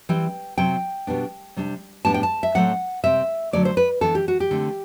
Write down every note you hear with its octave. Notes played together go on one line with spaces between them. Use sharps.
E3 G3 C4 G5
C3 F#3 C4 G5
B2 G3 B3 D4
C3 G3 D4
A2 G3 B3 D4 A5
G5
A5
E5
A2 F#3 A3 C4 F#5
C3 G3 C4 E5
D3 F#3 A3 D5
C5
B4
E3 B3 D4 A4
G4
F#4
G4
D3 A3 C4